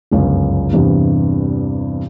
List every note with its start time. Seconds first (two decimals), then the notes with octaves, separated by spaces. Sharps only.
0.11 G1 C#2 F#2
0.73 E2 G2 C3